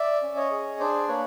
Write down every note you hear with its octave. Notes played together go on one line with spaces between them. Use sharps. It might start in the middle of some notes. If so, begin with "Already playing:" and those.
Already playing: D5 E5
C#4
C#5 D#5
G#4
D4 C5 D5
A#3 B4 C#5